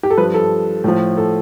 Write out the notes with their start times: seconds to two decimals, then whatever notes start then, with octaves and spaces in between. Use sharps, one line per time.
0.03 G4
0.10 A4
0.18 G2 F3 B4
0.34 A4
0.84 A2 F3
1.17 A4